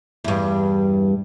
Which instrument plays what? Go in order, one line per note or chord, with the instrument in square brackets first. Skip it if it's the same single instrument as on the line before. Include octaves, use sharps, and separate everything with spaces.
[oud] E2 G2